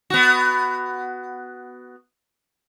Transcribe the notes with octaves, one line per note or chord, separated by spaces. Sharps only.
B3 F#4